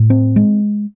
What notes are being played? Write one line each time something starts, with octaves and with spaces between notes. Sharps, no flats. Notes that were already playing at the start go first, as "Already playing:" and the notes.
Already playing: A2
C4
G#3